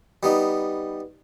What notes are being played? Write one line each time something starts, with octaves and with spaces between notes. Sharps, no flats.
G3 B3 D#4